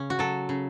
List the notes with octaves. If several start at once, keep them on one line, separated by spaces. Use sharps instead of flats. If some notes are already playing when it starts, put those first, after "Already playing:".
Already playing: C#3 C#4
F#4
F#3 A4
C#3